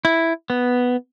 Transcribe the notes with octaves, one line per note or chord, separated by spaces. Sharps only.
E4
B3